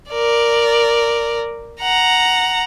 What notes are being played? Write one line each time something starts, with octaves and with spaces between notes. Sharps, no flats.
A#4 D5
F#5 A#5